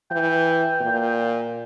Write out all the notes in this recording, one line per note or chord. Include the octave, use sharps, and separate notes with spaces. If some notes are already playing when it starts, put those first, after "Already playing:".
E3 G5
A#2